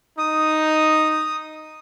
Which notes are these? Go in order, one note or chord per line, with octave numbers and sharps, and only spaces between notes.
D#4 D#6